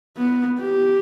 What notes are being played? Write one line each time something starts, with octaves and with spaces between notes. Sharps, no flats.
B3
G4